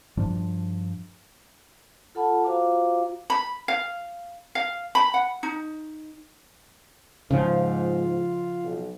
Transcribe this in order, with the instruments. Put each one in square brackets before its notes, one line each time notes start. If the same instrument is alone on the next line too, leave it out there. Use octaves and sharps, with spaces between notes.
[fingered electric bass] G2 F3 D4
[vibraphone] F4 A4 F#5 A5 B5
F4 F#4 C5 F5 A#5 D6
[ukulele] B5
F5
F5
B5
F#5
D#4
[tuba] G#2 [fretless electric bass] C#3 F3 [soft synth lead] F4
[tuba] B1